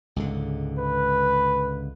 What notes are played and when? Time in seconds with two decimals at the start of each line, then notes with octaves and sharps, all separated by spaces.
0.16 C#2 G#2 D3
0.78 B4